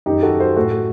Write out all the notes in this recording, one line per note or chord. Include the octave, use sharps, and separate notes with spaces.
F#2 D#3 D#4 G4
F#4 A4
A4 C5
A2 F#4 A4